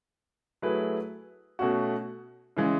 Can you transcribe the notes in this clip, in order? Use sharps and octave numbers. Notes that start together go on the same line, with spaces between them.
F#3 A3 E4 G#4 B4
B2 A3 C#4 F#4
C#3 E3 G#3